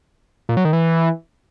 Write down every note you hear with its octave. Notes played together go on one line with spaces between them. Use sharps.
A#2
F#3
D#3
E3